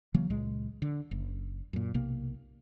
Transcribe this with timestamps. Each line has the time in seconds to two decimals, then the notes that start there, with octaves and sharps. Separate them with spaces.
0.14 C#3 E3 F#3 A#3
0.30 C#2 A#2 G#3
0.82 D3
1.11 F#1
1.73 F#2 A#2
1.94 B1 C3 A#3